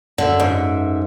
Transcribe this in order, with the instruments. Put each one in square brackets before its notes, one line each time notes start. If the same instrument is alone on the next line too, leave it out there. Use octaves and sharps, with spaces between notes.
[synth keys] F#2 E5 [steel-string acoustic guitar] D3
[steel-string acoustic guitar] G#2